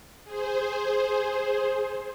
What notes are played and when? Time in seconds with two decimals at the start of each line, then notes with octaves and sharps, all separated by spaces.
0.25 G#4 C5